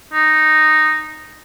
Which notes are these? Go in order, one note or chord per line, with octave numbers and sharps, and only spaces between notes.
D#4